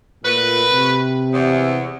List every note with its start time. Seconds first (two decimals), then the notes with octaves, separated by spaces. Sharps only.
0.24 A#2 A3 F#4 B4
0.71 C3
1.33 E2